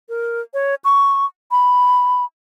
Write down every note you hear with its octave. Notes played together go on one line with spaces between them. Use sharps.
A#4
C#5
C#6
B5